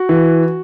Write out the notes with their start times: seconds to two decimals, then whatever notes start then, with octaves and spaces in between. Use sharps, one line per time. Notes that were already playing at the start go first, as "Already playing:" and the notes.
Already playing: F#4
0.09 E3